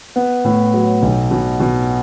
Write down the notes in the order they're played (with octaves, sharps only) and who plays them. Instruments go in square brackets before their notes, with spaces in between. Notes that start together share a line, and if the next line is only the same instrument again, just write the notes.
[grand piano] B3
A2
F#3
B1
B2
B2